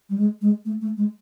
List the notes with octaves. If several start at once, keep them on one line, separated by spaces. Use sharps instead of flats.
G3
G#3
G#3
A3
A3
G#3